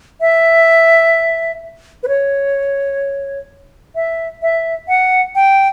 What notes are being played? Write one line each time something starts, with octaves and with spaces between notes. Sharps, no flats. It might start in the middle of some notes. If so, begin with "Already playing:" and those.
E5
B4
C#5
E5
E5
F#5
G5